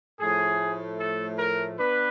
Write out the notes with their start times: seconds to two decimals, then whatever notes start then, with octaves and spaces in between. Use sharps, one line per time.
0.20 A2 F3 A3 G#4
0.99 A4
1.39 A#4
1.78 B3 D4 B4